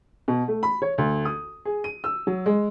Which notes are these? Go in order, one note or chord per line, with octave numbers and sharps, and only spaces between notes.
B2
A3
B5
C#5
D2
D#6
G#4
D#7
E6
F#3
G#3